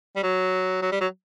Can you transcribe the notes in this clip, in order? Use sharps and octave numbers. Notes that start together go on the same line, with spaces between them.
G3
F#3
F#3
G3
F#3